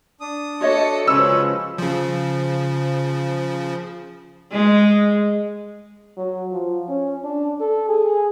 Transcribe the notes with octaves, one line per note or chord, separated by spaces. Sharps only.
D4 D#6
F#4 A4 C#5 D#5 C#7
C#3 F3 G#3 C#4 B4 E6
C#3 F3
G#3
F#3
F3
C#4
D4
A4
G#4